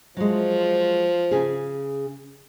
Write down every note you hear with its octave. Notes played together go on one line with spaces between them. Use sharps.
F3 F#3 G#3
C#3 G#4